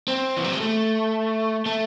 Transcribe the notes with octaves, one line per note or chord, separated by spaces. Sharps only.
C4
E3
F#3
G#3
A3
A3